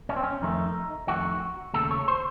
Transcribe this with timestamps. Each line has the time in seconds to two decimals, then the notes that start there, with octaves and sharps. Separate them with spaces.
0.09 C#4
0.16 C4
0.23 C#4
0.42 F2 D#3 A3 D#4
1.08 F2 D#3 A3 F#4
1.74 D#2 C#3 A3 A4
1.91 C#5
2.08 C5